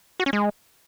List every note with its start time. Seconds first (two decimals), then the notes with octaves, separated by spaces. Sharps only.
0.20 F#4
0.26 C#4
0.33 G#3